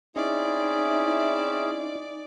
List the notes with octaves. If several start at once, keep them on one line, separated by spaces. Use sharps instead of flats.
C4 C#4 D#4 E4 G#4 D5